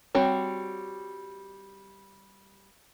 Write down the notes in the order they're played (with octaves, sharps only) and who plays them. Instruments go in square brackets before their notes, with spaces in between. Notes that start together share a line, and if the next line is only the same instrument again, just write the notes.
[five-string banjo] G3 C4 F#4 C#5